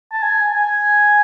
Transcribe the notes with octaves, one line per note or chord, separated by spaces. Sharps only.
A5
G#5
G#5